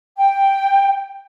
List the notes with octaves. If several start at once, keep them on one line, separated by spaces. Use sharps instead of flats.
G5